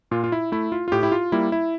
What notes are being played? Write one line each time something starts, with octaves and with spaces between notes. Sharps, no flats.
A#2 F4
F4
E4
A3 E4
F4
F4
A2 G4
E4
F4
G3 A#3 E4
E4